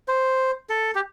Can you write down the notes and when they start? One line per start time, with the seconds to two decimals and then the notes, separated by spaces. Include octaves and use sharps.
0.08 C5
0.70 A4
0.95 G4